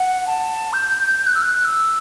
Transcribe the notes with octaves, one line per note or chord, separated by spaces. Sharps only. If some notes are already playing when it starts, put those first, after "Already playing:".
Already playing: F#5
A5
G6
G6
F#6
E6
F#6
F#6
E6